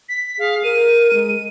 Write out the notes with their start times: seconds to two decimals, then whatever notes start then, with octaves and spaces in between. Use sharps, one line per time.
0.09 B6
0.39 G#4 F5
0.63 A#4 D#7
1.14 G#3